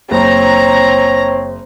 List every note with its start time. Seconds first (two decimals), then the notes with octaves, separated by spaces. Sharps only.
0.11 F#1 C4 C#5 A#5